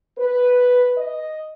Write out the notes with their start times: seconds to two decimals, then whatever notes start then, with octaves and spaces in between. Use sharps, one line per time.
0.18 B4
0.98 D#5